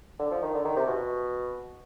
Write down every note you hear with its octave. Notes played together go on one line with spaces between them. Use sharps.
D3
F3
D#3
D3
D#3
C3
B2